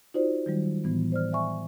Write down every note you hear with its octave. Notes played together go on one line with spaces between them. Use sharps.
D#4 F4 F#4 C5 D5
D#3 F#3 G3
A2 E3 B3
C5 D5 F6
D5 E5 G#5 C#6